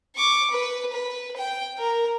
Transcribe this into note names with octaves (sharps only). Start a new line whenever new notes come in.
C#6 D6
B4
B4
G5
A#4